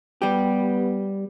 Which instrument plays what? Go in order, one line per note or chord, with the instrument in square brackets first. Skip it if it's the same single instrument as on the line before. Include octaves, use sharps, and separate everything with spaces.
[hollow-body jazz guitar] G3 G4 [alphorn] B3